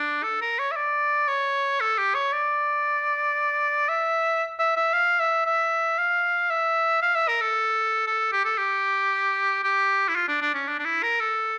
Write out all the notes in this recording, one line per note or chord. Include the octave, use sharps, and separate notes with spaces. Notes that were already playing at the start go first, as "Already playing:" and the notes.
Already playing: D4
A4
A#4
C#5
E5
D5
C#5
A4
G4
C#5
D5
E5
E5
E5
F5
E5
E5
F5
E5
F5
E5
A#4
A4
A4
G4
A4
G4
G4
E4
F4
D4
D4
C#4
D4
D4
E4
A#4
A4